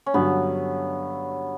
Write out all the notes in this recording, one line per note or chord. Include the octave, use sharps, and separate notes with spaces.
C#4
G2 D3 F#3 B3